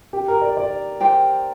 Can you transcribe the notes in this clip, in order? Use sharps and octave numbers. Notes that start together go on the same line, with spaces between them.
G4
A#4
D5
D5
G4 C5 G5